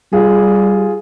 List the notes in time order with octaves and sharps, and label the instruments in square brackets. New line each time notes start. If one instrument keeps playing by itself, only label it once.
[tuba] G3 [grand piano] F4 G#4